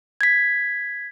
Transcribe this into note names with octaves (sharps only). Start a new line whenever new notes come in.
G#6 B6